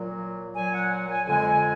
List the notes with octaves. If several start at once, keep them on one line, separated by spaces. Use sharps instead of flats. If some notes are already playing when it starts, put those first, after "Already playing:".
Already playing: A#2 F#3
A#2 F#3 G#5
F#5
F#5
G#5
F2 D3 G#3 G#5